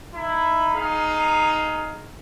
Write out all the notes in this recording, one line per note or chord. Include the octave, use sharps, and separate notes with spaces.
D#4 E4 B5
D#4 G#4 F5